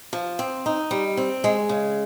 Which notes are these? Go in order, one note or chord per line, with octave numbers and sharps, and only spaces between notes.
F3
C4
D#4
G3
C4
G#3
C#3